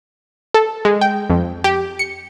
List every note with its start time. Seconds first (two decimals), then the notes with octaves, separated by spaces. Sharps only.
0.54 A4
0.85 G#3
1.01 G5
1.30 F2
1.64 G4
1.99 C#7